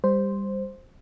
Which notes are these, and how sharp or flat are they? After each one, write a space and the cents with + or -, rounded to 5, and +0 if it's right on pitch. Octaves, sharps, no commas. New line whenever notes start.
G3 +20 C5 +0